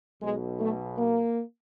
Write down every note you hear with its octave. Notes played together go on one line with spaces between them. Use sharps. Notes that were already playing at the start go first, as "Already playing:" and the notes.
B1 B2 G#3
A3
A#3